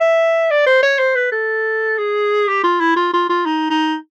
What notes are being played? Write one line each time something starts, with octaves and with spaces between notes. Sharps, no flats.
E5
D5
C5
C#5
C5
B4
A4
G#4
G4
F4
E4
F4
F4
F4
D#4
D#4